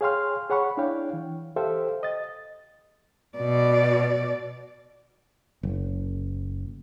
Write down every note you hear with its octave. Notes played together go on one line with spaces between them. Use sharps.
G#4 C#5 F5 G5 C6 F6
G#4 C#5 F#5 B5 C#6
D4 E4 C#5 F5 G5
E3
G4 A4 C5 E5 F5 G5
D#5 A6
B2 D5
F#1